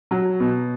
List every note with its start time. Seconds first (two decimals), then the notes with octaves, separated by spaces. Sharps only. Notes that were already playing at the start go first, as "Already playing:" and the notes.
0.11 F#3
0.40 B2